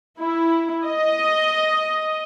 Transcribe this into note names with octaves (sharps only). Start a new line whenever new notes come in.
E4
D#5